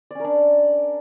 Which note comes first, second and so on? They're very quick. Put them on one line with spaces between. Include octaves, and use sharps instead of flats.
D5 C#4 A#4 D4